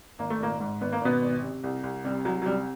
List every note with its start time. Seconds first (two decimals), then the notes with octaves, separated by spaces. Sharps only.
0.19 G#1 A#3
0.30 A3
0.40 G#1 A#2 A#3
0.60 G#2
0.81 G#1 B3
0.92 A#3
1.01 G#1 B2 B3
1.22 G#1
1.43 C3
1.64 C2
1.83 C2
2.04 C3 G3
2.25 C2 F#3
2.42 F#3
2.46 C3 G3